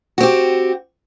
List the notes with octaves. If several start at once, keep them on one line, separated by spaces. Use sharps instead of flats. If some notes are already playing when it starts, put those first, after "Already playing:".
C4 F#4 G4